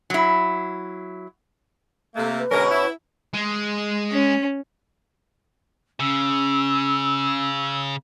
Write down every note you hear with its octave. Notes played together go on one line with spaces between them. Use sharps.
F#3 E4
C3 A3 A#3 A4
B4
B2 D3 G#3 C#4 A#4
E4
G#3
C#4
C#3 C#4 E6